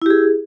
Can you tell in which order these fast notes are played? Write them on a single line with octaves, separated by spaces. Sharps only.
E4 G4 G#4